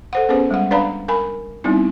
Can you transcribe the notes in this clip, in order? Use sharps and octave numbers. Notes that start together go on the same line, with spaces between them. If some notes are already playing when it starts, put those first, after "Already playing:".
A4 C5 F#5
B3 C#4 G#4 B4 C5
G3 G#3 F#5
D4 B4 D5 F5 A#5 B5
A#4 G#5 B5
G3 B3 C4 D#4 E4